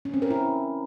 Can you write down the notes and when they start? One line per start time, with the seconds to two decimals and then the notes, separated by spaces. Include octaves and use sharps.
0.05 C#4
0.14 C4
0.22 A#4
0.30 E4